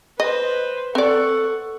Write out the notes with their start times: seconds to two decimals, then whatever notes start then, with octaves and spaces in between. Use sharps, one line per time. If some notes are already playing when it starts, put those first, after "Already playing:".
0.20 B4 C5 D#5
0.95 C4 A4 D5 F#5 C#6